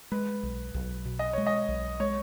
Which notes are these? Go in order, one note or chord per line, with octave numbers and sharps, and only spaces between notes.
G#3 B4
B1
B1
B2
D#5
G#3 C#5
D#5
B1
G#3 C#5